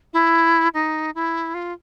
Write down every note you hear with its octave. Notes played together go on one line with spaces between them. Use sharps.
E4
D#4
E4
F4